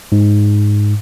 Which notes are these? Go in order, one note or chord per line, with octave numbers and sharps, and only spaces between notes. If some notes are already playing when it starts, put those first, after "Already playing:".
G#2